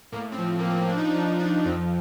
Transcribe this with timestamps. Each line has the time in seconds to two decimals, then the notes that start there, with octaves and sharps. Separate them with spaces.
0.12 A2 A#3
0.32 C4
0.38 F3
0.59 F3 A#3
0.70 C4
0.89 F3 D4
0.97 D#4
1.04 D4
1.14 F3 D#4
1.39 F3 D4
1.65 F2 C4